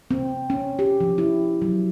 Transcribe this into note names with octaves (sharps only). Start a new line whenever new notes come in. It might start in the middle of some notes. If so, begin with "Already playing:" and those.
C4
C#4
G4
F3
E4
F#3